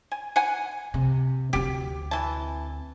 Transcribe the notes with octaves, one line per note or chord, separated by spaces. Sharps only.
G#5
F#5 G#5
C3
D2 C4 G4
E3 A5